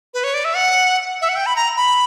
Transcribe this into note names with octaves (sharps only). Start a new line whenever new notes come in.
B4
C#5
D5
E5
F#5
E5
F#5
G5
B5
A#5
B5